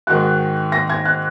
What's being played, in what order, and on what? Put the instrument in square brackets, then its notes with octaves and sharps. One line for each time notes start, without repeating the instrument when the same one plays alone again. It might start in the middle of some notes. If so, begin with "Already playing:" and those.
[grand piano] G#2 D#3 G#3 F#4 [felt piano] F#6
[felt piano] A#6
G#6
F#6